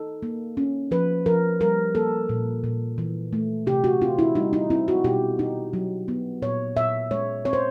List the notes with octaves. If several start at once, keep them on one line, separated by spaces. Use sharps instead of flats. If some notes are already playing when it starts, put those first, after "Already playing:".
Already playing: D#4 A4
A#3
C#4
F3 B4
F3 A#4
G3 A#4
A#3 A4
A#2
A#2
E3
A3
C3 G4
F#4
C4 F4
E4
G3 D#4
D#4
C4 E4
F#4
B2 G4
D#4
F#3
B3
A#2 C#5
A#2 E5
G#3 C#5
C4 C#5
C5